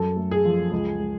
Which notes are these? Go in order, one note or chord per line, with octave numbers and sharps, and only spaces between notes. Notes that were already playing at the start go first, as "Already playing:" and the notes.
Already playing: F#2 A4
A3
G#4
F3
C#2
G#3